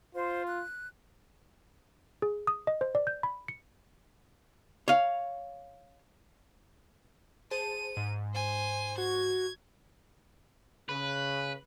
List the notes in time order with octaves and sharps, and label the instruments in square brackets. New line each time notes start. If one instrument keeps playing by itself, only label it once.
[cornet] F4 [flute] C5
[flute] F#6
[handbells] G#4
D#6
D#5
C5
D5
G6
B5
C#7
[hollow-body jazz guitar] C#5 F5
[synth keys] G#4 C5 A5 [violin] D#7
[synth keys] G#2
[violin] C5 G#5
[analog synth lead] F#4 [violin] G#6
[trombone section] C#3 [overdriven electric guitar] B4